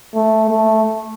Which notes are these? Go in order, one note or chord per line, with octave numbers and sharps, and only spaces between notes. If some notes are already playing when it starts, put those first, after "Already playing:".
A3
A3